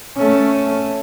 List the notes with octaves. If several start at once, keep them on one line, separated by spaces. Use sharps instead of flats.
A3 C#4